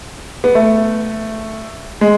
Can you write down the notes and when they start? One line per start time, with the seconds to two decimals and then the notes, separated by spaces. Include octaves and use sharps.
0.44 B3
0.55 A3
2.01 G#3